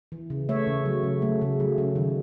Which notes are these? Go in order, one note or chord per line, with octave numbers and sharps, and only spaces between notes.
E3
C#3
A3 C#5 E5
C#3
F#3
C#3
A3
C#3
F#3
C#3
D#3